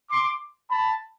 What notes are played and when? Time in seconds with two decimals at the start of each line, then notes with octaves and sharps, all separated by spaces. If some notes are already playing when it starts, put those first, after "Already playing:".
0.09 C6 D6
0.69 A5 B5